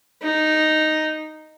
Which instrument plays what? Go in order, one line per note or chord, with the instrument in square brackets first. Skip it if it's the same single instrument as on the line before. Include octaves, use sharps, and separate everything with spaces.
[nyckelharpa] D#4